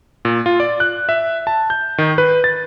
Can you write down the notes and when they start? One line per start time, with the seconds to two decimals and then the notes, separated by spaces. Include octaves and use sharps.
0.25 A#2
0.46 F4
0.60 D5
0.80 F#6
1.09 E5
1.47 A5
1.70 G6
1.98 D#3
2.18 B4
2.44 A6